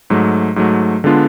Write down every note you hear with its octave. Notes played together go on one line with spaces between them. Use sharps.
G#2 F#3 A3
G#2 F#3 A3
D3 G#3 B3 D4 F4